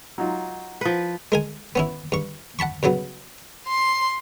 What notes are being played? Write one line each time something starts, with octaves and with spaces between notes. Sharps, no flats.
F#3 D#4 F4
F3 B4
G#3 A#4 G#5
B3 C#4 E4
G2 C#6
F#5 A5 B5 C#6
G2 C#3 F#3 B3
C6